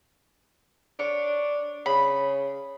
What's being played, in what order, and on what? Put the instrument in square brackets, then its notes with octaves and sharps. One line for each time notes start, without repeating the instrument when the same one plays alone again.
[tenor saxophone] D4 [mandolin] C#5
[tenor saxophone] C#3 [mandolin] B5